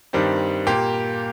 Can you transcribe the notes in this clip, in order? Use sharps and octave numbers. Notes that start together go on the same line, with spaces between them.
G2 D#3 G3 C4
A#2 A#3 G4